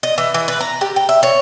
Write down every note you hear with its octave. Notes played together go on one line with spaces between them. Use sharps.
D#5
E3
E3
B4
A#5
G4
G5
E5
C#5